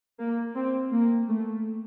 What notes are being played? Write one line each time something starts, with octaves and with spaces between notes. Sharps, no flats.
A#3
C4
A#3
A3